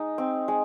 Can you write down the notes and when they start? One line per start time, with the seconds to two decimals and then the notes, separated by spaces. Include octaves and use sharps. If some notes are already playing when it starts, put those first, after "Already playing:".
Already playing: G#3 D#4
0.18 C4
0.48 G#3